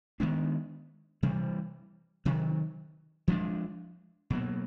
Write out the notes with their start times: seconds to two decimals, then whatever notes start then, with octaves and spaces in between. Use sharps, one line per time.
0.20 D#3 G#3 B3 D4
1.23 C3 E3 G3
2.25 C3 D#3 F#3
3.28 F3 G#3 B3 D4
4.30 B2 F#3 A#3